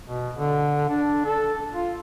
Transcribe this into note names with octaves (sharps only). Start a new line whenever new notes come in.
B2
D3
D4
A4
F4